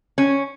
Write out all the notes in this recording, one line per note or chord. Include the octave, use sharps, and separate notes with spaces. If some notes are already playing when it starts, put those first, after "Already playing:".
C#4